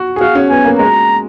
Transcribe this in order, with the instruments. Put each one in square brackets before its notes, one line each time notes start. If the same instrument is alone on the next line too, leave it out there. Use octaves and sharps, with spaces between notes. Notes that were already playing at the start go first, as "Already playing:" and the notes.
Already playing: [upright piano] F#4
G#4
[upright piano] F#4 [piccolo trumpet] F5
[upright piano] C#4
[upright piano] B3 [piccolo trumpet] G#5
[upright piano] A#3
[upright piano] G#3 [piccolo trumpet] A#5